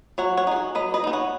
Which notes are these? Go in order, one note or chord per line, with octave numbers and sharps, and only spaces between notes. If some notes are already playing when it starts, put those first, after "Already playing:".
F#3 C#5 F#5
C#5 F#5
D#4 G#4
F#4
F#3 B4 D#5
B4 D#5
B3 D#4
C#5 F#5